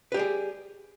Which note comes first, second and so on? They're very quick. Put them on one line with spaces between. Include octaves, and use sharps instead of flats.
B4 G4 D5 G#4